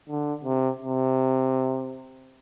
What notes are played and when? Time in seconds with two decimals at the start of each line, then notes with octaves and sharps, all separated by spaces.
0.09 D3
0.44 C3
0.80 C3